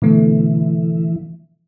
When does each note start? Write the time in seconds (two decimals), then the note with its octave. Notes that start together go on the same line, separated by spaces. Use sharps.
0.02 B2 D3 E3 A3